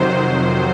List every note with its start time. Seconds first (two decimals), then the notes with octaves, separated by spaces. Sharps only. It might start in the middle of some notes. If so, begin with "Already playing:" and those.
Already playing: F2 C3 D#3 F#3 C5